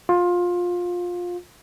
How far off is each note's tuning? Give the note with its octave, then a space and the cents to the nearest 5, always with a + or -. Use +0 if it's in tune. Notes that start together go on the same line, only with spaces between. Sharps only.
F4 +20